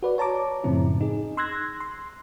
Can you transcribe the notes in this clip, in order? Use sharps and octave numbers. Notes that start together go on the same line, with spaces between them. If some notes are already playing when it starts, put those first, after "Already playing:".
F#4 B4 D5
C#5 A5 A#5 D6
F#2 A2 C#3 F3 C4 E4
D#4 G#4
C6 E6 F#6 G#6 A#6
C6